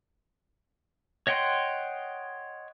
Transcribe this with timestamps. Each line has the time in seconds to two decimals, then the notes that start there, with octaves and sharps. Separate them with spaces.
1.27 C#5 D#5 F#5 G5 C6